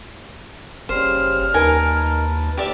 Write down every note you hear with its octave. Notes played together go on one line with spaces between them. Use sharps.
F#1 C#3 G3 C5 F6
D#2 D#4 A#4 B4 G#5 A5
D#2 G4 D5 E5